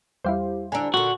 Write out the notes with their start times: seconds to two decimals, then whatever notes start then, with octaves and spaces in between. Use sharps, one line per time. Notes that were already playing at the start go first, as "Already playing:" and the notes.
0.24 E2 G3 E4 G4 C5 F5
0.72 D3 D4 G#5 A#5 E6
0.94 A#2 D3 F#4